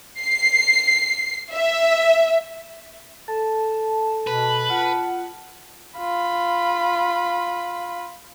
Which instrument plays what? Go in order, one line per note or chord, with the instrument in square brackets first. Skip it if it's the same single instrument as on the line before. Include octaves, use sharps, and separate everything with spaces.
[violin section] C7
E5
[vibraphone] A4 [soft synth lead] A5
[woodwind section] B2 [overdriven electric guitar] B4
[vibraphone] F4 [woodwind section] F#5
[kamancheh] F4 B5